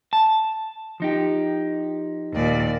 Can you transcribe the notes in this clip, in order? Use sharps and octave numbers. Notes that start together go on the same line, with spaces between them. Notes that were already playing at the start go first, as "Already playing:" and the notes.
A5
F3 D#4 G4
D#2 A#2 D5